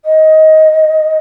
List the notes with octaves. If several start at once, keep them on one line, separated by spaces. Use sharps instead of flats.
D#5